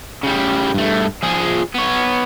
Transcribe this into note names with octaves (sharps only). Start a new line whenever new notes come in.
C#3 G3
G2 A3
F3 G#4
B3 C#5